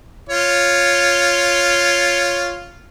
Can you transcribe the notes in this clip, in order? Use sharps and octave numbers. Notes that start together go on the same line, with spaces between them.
F4 C#5